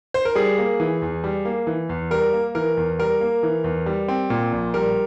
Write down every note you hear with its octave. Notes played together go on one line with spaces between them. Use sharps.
C5
A#4
G3 G#4
A#3
E3
E2
G3
A#3
E3
E2
G3 A#4
A#3
E3 A#4
E2
G3 A#4
A#3
E3
E2
G3
C4
A#2
A#1
G3 A#4